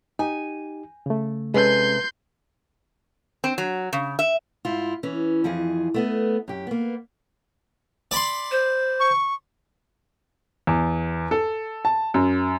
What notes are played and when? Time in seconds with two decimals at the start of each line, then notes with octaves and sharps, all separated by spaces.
0.19 D#4 G4 G#5
1.06 C#3 A3
1.54 C3 G#3 C#4 A4 B4 G#5 C6 G6
3.44 C4
3.58 F#3
3.93 C#3
4.19 E5
4.65 G#2 E4 F4
5.03 E3 C#4
5.44 F2 E3 F3 G#4 D#5
5.94 A3 B3 D#5
6.48 F#2 G4
6.67 A#3 B3
8.11 D5 B5 C6
8.51 C5
9.00 C#6
10.67 E2
11.31 A4
11.85 A5
12.14 F#2